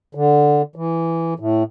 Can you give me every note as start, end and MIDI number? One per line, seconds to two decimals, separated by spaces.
0.15 0.62 50
0.76 1.34 52
1.39 1.63 45